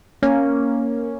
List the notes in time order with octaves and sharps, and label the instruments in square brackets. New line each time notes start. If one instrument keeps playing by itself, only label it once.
[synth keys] A#3 C#4